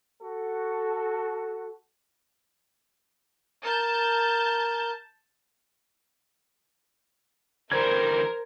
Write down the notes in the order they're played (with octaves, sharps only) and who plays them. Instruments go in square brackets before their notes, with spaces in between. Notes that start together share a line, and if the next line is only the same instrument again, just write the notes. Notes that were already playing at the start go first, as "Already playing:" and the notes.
[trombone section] F#4 A4
[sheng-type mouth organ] A#4 [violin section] A5 G6
[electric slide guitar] D3 E3 G3 [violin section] A#4 [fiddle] C5 [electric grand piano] G#6